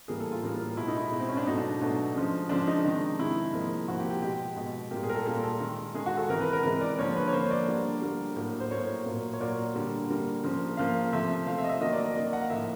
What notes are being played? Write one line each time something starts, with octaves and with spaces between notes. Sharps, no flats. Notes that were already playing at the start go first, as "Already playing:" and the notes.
A2 E3 G3 A#3 G#4
A4
F4
A2 E3 G3 A#3
B2 G#3 E4
D#4
E4
B2 G#3
C4
C#4
D4
B2 F#3 A3 D#4
D4
B2 F#3 A3
C#3 F3 G#3
C#3 F3 G#3 D4
D#4
C3 D#3 G#3
C3 D#3 G#3 E4
C3 F3 A#3
C3 F3 A#3 F#4
G4
G4
B2 G#3 G4
B2 G#3
A#2 G3 A#3 G4
G#4
A#4
A4
A#2 G3 A#3 A4
A4
D#3 G#3
D#3 G#3 G#4
F#4
A4
C3 E3 G#3 A#4
B4
A#4
C3 E3 G#3 A#4
D5
D3 F3 A#3 C#5
B4
C#5
D3 F3 A#3 C5
D5
D3 G3 A#3
D3 G3 A#3
A2 F#3 A#3
C5
A2 F#3 A#3 C#5
A#2 F#3 A#3
C#5
A#2 F#3 A#3 D5
D3 G3 A#3
D3 G3 A#3
C#3 F3 A#3
C#3 F3 A#3 F5
C3 F3 A3 E5
C3 F3 A3 F5
E5
D#5
E5
D#3 F#3 A#3 D#5
D5
D5
D#3 F#3 A#3 D#5
F#5
F5
A2 F3 A#3 E5